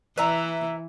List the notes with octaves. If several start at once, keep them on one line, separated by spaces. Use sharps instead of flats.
E3 B4 E5 A#5